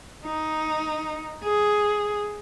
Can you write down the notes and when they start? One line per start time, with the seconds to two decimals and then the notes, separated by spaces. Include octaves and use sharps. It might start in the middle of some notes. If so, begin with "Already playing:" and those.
0.25 D#4
1.44 G#4